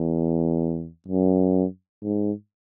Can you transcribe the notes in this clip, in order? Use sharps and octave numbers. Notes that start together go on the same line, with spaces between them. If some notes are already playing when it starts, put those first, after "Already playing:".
Already playing: E2
F#2
G#2